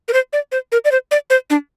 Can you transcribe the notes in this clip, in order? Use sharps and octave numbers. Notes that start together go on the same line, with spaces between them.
A#4
C5
D5
C5
A#4
D5
C5
D5
C5
D4